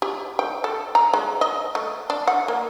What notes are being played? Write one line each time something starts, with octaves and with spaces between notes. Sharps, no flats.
G4
G5
A4
A#5
G#3
D#5
A3
D4
F#5
A#3